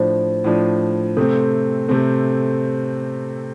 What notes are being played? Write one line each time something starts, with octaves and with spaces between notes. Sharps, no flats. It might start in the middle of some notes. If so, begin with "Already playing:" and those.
Already playing: A2 F3 D4 C5
A2 F3 D4
C3 A3 C4 A4
C3 A3 C4 A4